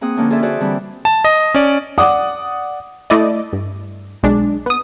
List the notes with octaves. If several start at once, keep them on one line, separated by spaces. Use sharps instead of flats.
A#3 C4 G#4 F#5 D#6
D3 F3 A#3 C#4 D4
F4 G#4 A4 D5 E5
F#4 G#4 C5 D5
D3 E3 G3 C4 D4
A5
D#5
C#4 D5
D5 F#5 D6 D#6
A3 E4 D5 D#5
G2
B1 G#3 D4
B3 D#6